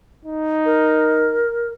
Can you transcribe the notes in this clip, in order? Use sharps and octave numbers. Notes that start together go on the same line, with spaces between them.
D#4
A#4